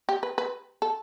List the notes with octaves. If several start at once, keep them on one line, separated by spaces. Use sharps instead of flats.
G4
B4
B4
A4